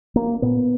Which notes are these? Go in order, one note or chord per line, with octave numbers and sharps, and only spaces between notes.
A#3
A#2 B3